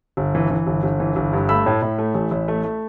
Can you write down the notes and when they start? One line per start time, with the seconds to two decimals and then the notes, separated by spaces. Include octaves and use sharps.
0.17 G1
0.35 E3
0.50 E3
0.67 G1
0.83 G1
1.00 E3
1.16 G1
1.33 G2
1.49 A3 B5 E6
1.66 A2
1.82 A2
1.98 A3
2.15 A1
2.31 A1
2.48 A3
2.64 A3